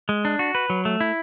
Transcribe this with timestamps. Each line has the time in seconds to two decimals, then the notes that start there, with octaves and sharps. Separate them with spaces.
0.09 G#3
0.25 D4
0.39 F#4
0.55 B4
0.70 F#3
0.85 A3
1.01 E4